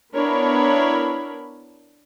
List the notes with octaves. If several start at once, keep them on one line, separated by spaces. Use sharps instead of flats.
B3 D4 E4 A#4 C#5 B5